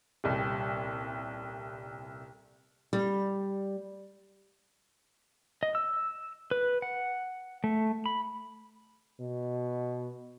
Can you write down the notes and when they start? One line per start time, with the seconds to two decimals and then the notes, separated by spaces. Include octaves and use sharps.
0.24 D#1 C2
2.93 G3
5.63 D#5
5.75 E6
6.51 B4
6.82 F#5
7.64 A3
8.06 B5
9.20 B2